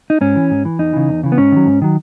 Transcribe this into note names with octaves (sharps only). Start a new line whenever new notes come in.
D#4
G#2 C#4
E3
G#2
E3
E2 D#4
C#3 E3
E2
C#3 E3
B3
G#2 C#4
D#3 F#3
G#2
D#3 F#3